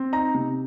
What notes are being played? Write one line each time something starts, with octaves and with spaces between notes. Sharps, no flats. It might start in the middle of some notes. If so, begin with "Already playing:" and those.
Already playing: C4
D#4 A#5
C3